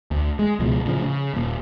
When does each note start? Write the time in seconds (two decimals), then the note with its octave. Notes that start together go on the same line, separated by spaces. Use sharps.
0.11 D2
0.39 G#3
0.59 C#2 B2 F3 G#3
0.86 A2 C#3 F3
1.02 C#3
1.34 D#1 A#2